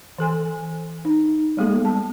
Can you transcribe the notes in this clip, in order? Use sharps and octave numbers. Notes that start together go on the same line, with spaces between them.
E3 A4 G#5
D#4
G3 G#3 A#3 B3 G#4 A4
A5